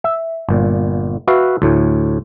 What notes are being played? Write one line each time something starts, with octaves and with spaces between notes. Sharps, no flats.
E5
G1 A#2
F#4 B4 E5 F5
D2 A2